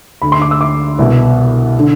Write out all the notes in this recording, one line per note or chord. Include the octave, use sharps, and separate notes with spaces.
D2 D3 B5
C6
D6
E6
D6
C2 B2
D3